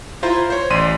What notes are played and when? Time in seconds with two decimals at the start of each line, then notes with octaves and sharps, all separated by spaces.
0.23 E4 F4 C5 A#5
0.50 C5 C#5
0.70 A1 D5 C6 D#7